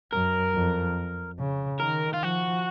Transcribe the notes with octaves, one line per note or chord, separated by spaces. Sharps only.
F#2 A#4
F2
C#3
D#3 A#4
F4
F3 F#4